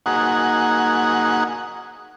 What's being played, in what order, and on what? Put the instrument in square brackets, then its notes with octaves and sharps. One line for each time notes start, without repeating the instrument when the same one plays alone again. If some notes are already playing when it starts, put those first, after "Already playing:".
[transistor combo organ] A#3 D#4 F#4 G#4 F#5